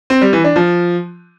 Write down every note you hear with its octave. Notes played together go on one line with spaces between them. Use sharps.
C4
G3
E3
D4
F3